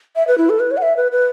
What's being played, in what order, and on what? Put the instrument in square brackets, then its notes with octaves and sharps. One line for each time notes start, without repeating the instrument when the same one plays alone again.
[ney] E5
B4
E4
A4
B4
C#5
F#5
E5
B4
B4